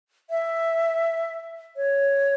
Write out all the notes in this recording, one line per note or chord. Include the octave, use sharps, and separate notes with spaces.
E5
C#5